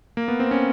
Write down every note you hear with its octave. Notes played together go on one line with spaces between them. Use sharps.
A#3
B3
C4
C#4